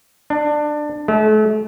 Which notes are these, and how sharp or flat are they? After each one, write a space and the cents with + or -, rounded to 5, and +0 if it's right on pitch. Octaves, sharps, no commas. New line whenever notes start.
D4 +20
A3 -40